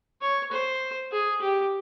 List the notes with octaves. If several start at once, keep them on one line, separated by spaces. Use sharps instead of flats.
C#5
C5
G#4
G4